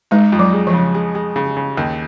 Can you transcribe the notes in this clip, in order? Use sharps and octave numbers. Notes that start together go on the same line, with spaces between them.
G#3 D#4
F2
F#3
G#3
F3
C#3
G#3
G#3
C#3
C#3
D#2